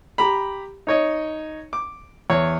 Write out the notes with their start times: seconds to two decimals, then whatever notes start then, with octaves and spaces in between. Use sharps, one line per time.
0.18 G4 A#5 B5
0.87 D#4 C#5 D#5
1.73 D6
2.30 E2 C#5